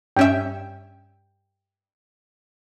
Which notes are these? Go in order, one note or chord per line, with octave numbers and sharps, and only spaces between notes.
G2 C#4 E5 G5